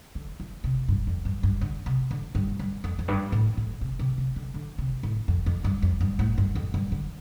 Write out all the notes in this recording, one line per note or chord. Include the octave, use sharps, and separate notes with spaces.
D3
F3
C3
G2
F2
G2
G2
D3
C3
D3
G2
G2
F2
F2
G2
A2
A2
C3
C3
C3
D3
D3
C3
A2
F2
F2
G2
F2
G2
A2
G2
F2
G2
D3